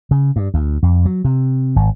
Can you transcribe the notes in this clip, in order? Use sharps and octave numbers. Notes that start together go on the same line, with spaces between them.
C#3
G2
D2
F2
F#3
C3
G#1